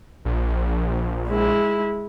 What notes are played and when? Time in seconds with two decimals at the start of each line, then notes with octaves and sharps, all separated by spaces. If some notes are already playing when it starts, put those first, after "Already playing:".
0.25 A#1
1.29 G#3 E4